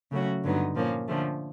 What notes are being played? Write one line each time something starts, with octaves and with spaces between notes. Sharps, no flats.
C#3 F#3 A3 C#4 F#4
G2 D3 F#3 B3 D#4
A#2 F3 A#3 C#4
D3 F3 A3 C#4